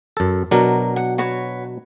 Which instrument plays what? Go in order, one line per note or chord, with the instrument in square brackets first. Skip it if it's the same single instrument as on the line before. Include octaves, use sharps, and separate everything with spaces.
[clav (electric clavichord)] F#2 A4
[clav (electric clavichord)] B2 F#3 D4 [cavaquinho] A#4
[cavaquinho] F#5
F#4 B4 C#5